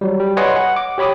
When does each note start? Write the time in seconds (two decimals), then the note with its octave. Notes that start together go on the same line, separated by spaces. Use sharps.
0.01 F#3 G3
0.20 G3
0.37 B4 C#5 D#5 F#5 G#5 C6
0.56 F#5
0.76 D6
0.98 G4 C#5 B5 D6 D#6